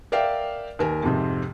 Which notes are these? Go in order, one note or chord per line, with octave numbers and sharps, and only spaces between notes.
A#4 D5 E5 F5 G5
D#2 A#4 G#5
F2 G#2 C3 C4